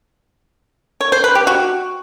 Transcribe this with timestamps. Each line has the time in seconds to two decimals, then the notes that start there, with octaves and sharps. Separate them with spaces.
1.01 C#5
1.12 C5
1.24 B4
1.35 G4
1.47 F#4